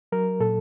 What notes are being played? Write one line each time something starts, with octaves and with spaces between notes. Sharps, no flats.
F#3 A#4
A#2 A4